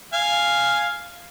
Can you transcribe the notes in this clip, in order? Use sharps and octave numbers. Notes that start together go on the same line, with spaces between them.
F5 G#5 F6